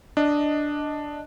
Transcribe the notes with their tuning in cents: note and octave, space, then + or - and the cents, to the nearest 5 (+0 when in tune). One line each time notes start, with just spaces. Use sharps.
D4 +0 D#5 +0